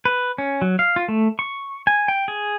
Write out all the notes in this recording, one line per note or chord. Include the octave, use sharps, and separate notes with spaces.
B4
C#4
F#3
F5
F4
A3
C#6
G#5
G5
G#4